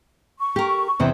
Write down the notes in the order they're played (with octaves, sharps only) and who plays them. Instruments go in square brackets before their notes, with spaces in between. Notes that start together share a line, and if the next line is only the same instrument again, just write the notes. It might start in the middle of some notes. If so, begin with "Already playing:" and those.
[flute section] C#6
[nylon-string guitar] G4 A#4
E2 C3 E3